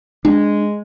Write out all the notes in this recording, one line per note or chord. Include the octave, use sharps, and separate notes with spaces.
G#3 D4